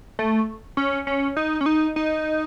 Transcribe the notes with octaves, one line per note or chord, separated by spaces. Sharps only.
A3
C#4
C#4
D#4
C#4
D#4
D#4